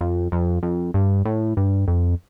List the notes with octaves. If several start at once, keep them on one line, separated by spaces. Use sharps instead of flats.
F2
F2
F2
G2
A2
G2
F2